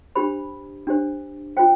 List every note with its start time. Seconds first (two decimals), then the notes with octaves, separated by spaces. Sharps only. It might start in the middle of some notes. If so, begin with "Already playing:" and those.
0.15 D4 G4 C5 B5
0.87 D4 G4 C5
1.57 F4 C5 G5